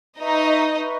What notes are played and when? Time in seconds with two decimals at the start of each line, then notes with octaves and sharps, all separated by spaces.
0.19 D#4 B4 D#5 E5 A#5 C#6
0.74 B4 E5 A#5 C#6